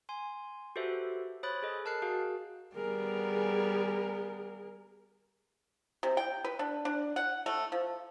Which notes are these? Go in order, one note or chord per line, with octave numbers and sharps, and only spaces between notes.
G#5 C6
F#4 G4 A4 B4 C5 E5
C5 C#5 B5 D#6 F#6 A6
G#4 A4 D#5
A#4 A5 F6 F#6 C7 C#7
F#4 G#4 A#4 F5
G3 B3 G#4 A#4
C3
G5
B4
D4
D4
F#5
A3
F3